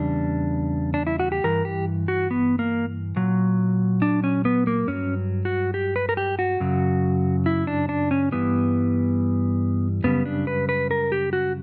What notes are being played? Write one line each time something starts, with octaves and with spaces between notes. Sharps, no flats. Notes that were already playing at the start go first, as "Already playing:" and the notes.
Already playing: E2 C#3 G3 D4
D4
E4
F#4
G4
G2 E3 A#4
G4
F#4
B3
A#3
A#2 F#3
D4
C#4
B3
A#3
G2 F#3 C#4
F#4
G4
B4
A#4
G4
F#4
F#2 C#3 F#3
E4
D4
D4
C#4
G2 E3 G3 B3
F#2 C#3 G3 B3
D4
B4
B4
A#4
G4
F#4